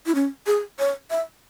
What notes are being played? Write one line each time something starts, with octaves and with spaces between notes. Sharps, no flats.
E4
C#4
G#4
C#5
E5